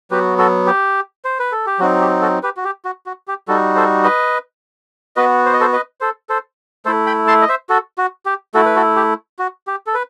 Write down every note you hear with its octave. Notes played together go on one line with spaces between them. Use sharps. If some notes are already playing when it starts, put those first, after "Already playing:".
F#3 B3 F#4 G4 B4
F#4 A4
G4
C5
B4
A4
G4
F#3 C4 D#4 F#4
G4
F#4 A4
G4 B4
F#4
G4
F#4
F#4
G4
G3 D#4 F#4 A4
A4 C5
B4 D#5
B3 F#4 B4 D#5
C5
D#5
A4 C5
B4 D#5
A4 C5
A4 C5
A3 E4 A4 C5
G5 B5
A5 C6
D#5
C5 E5
F#4 A4
F#4
G4
A3 E4 F#4 A4
B4
F#4 A4
G4
F#4
G4
A4
B4